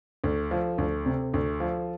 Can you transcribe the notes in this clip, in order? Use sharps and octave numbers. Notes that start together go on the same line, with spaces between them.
D2
F3
D2
C3
D2
F3